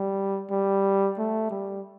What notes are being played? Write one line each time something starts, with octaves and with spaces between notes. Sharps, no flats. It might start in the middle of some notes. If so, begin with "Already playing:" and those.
Already playing: G3
G3
A3
G3